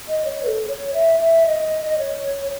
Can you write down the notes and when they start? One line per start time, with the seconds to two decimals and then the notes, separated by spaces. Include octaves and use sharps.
0.09 D#5
0.25 C#5
0.43 B4
0.47 A4
0.68 C#5
0.94 E5
1.20 E5
1.46 D#5
1.86 D#5
1.99 C#5